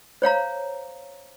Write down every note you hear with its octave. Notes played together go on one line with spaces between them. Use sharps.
C5 C#5 F5 A#5